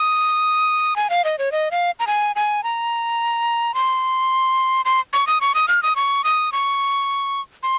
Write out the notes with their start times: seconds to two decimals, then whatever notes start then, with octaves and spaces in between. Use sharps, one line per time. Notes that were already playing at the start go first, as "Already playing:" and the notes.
Already playing: D#6
0.96 G#5
1.10 F5
1.25 D#5
1.39 C#5
1.52 D#5
1.71 F5
2.00 A#5
2.07 G#5
2.36 G#5
2.64 A#5
3.74 C6
4.85 C6
5.13 C#6
5.27 D#6
5.41 C#6
5.55 D#6
5.68 F6
5.83 D#6
5.96 C#6
6.24 D#6
6.52 C#6
7.63 C6